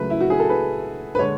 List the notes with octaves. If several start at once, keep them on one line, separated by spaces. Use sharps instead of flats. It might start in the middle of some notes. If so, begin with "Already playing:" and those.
Already playing: C#2 C#3 F#3 A3 B4
E4
F#4
G#4
A4
B4
B4
D3 G#3 C#5